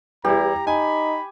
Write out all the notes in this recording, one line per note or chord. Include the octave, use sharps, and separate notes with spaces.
E2 G3 E4 G4 A#5
D#4 G#5 B5